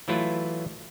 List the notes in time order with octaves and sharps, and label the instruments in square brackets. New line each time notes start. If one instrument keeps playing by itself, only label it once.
[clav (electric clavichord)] E3 F#3 A3 E4 F4 B4